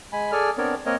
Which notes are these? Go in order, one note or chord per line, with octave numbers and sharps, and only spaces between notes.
G#3 G#5 B5
G#4 A4 D5 G#5 F6
B3 C4 D4 A#4 C#5 D5
A#3 C4 A#4 C#5 D#5